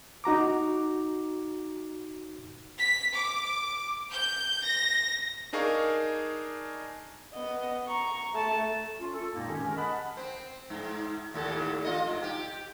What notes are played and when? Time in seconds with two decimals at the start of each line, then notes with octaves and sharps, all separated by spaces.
0.24 D#4 F#4 A#5 D6
2.79 B6
3.14 D6
4.12 G6
4.64 A#6
5.53 D4 D#4 G#4 A#4 F5 C#6
7.34 B3 D#5
7.88 A#5 C#6
8.34 A3 A5
9.00 C#4 F4
9.13 A4
9.34 F#2 A#2 G#3 A#3 C4 D#4
9.49 D#3 C#4 G4
9.63 G#3 C#4 G#4 A#4
9.76 D#5 F#5 A5 B5
10.17 C4 C5
10.70 G#2
11.34 D#2 A2 A4
11.84 F4 D#5
12.07 G#2 C3
12.23 G4